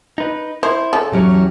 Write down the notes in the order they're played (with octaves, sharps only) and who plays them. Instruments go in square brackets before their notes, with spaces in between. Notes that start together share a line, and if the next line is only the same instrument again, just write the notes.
[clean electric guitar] D#4 B4
[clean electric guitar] E4 [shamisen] C5
[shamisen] C#3 A4
[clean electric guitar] E2 C#4 C#5 [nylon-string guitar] E3 F#3 G4